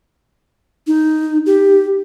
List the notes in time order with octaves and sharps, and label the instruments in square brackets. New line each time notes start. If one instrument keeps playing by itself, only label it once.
[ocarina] D#4
G4